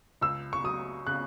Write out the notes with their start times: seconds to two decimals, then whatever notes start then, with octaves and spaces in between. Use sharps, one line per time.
0.21 C#2 E6
0.53 C#6
0.64 F#3 D#6
1.07 C#3 F#6